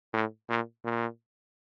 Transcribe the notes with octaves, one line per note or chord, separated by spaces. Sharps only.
A2
A#2
A#2